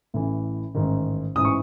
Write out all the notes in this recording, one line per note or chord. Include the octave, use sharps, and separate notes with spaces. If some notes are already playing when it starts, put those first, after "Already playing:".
A1 A2 E3
A1 G#2 D#3
A1 G#2 E3 D#6
C#6